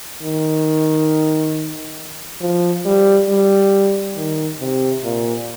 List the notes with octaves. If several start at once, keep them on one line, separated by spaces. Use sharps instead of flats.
D#3
F3
G3
G3
D#3
C3
A#2